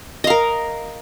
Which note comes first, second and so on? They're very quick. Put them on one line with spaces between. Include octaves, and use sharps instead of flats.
D#5 F5 A#4